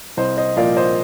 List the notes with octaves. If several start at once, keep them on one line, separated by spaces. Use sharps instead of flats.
C2 C5 D#5
C5 D#5
A#2 F3 A#3 D5 F5
C5 D#5